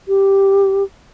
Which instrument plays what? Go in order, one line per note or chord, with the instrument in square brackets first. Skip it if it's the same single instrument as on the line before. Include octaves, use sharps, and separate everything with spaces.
[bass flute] G4